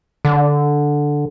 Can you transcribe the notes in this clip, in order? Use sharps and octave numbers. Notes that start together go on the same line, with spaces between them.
D3